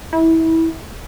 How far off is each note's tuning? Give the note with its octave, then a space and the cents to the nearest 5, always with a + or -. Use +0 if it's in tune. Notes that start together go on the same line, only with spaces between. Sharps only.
E4 -20